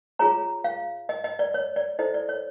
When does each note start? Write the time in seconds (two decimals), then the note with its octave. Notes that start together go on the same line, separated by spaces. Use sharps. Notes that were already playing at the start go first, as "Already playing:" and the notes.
0.19 F4 G#4 C#5 A#5
0.64 F5
1.09 D#5
1.24 D#5
1.39 D5
1.54 C#5
1.76 D5
1.99 E4 A4 C5 D#5
2.14 D5
2.29 C#5